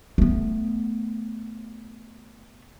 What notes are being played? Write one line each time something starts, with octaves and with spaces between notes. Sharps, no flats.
A3 B3